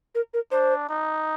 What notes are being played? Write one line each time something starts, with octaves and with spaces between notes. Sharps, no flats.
A#4
A#4
D4 C5
D#4